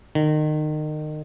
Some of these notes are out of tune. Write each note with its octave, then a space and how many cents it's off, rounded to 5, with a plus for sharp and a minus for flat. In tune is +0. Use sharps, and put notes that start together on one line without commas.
D#3 -30